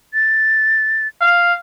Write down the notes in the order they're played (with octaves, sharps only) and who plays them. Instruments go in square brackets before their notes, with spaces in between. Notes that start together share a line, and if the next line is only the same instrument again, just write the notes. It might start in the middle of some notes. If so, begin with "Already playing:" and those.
[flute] A6
[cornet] F5